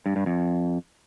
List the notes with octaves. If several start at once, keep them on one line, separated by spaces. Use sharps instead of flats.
G2
G2
F2